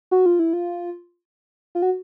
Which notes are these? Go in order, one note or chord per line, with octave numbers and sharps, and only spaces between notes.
F#4
F4
E4
F4
F4
F#4